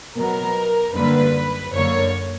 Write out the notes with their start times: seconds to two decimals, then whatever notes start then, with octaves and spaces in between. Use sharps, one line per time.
0.16 B2 F#3 B3 A#4
0.94 F#2 D3 G3 A#3 B4
1.72 F#2 D3 A#3 C#5